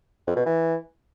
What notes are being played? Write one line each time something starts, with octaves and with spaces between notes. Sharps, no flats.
F2
B2
E3